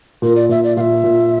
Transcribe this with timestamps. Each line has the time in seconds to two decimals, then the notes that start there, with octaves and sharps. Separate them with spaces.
0.22 A#2 A#4
0.36 D5
0.49 A#2 E5
0.64 D5
0.77 A#2 E5 F5
1.04 A#2